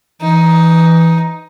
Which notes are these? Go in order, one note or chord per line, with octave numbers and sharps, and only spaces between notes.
E3 D#4